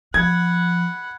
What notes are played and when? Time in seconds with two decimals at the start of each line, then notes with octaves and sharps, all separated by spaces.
0.14 F3 F#5 B5 G#6